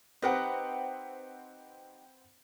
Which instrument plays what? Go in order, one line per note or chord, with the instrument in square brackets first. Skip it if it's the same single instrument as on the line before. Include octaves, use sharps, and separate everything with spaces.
[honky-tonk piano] C4 B4 F#5 [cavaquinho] D#4 G4 D#5